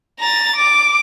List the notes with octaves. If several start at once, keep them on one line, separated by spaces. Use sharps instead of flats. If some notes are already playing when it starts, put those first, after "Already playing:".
A#5 A6
D6